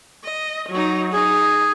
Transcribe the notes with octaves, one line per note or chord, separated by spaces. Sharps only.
D#5
F#3 D#4
D#4 G#4